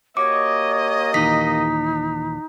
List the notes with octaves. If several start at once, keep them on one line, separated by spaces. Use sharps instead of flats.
A#3 F#4 G4 C#5 D#5 D6
D#2 A#2 E3 D#4 B6